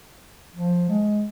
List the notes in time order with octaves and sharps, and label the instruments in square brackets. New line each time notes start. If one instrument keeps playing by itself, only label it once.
[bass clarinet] F3
G#3